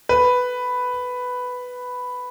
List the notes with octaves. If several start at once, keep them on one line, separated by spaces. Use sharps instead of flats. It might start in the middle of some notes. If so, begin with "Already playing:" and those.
B4